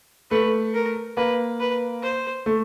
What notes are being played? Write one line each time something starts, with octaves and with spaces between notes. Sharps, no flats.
A3 B4
A#4
A#3 B4
B4
C5
A3